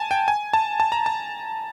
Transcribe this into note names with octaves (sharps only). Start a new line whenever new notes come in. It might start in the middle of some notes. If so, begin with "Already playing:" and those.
Already playing: G#5 A5
G5
G#5
A5
A5
A#5
A5